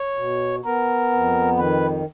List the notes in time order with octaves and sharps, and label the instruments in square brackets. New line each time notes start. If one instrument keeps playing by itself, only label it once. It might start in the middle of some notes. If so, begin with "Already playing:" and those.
Already playing: [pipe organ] C#5
[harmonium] B2
[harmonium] B3 [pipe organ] A#4
[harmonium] F2
[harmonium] D#3 [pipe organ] B4